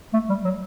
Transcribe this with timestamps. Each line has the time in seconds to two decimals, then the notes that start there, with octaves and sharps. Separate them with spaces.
0.13 A3
0.29 G3
0.45 F#3